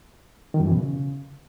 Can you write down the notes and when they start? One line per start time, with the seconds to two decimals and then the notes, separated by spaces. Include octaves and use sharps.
0.54 D#3
0.60 F#2
0.66 E3
0.71 B2
0.77 C#3